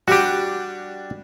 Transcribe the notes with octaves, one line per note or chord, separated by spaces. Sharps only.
G3 D4 F#4 G4